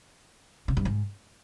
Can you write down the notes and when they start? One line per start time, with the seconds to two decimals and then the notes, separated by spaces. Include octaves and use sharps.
0.68 C#3
0.77 G2
0.85 G#2